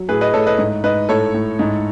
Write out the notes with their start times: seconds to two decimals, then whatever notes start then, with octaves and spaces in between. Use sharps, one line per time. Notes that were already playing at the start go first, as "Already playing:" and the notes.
Already playing: F#3
0.09 A2 G#4 B4
0.21 B4 D#5
0.34 A2 A4 C#5
0.47 B4 D#5
0.58 G#2
0.84 G#2 B4 D#5
1.09 A2 A4 C#5
1.34 A2
1.59 G#2